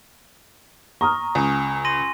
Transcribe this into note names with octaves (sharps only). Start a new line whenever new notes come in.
A#5 C#6 D#6 F6
C#2 G#5
C6 A#6 D#7